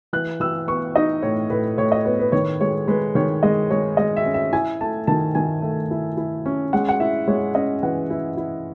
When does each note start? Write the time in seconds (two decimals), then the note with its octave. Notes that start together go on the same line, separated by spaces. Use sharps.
0.13 E3 F#6
0.40 E3 E6
0.68 B3 C#6
0.96 D#4 D#5
1.22 A2 C#5
1.50 A2 B4
1.77 A2 C#5
1.92 D#5
2.05 B3 C#5
2.19 B4
2.32 D#3 C#5
2.61 G#3 C#5
2.88 G#3 B4
3.15 D#3 C#5
3.43 G#3 D#5
3.71 G#3 C#5
3.97 G#3 D#5
4.17 E5
4.25 C#4
4.34 E5
4.53 E4 G#5
4.81 A3 A5
5.07 D#3 A5
5.35 D#3 G#5
5.62 A3
5.91 E4
6.17 E4
6.46 C#4
6.73 G#3 F#5
6.89 F#5
7.00 E4 E5
7.28 G#3 C#5
7.55 C#4 D#5
7.83 E3 F#5
8.10 E4
8.37 E4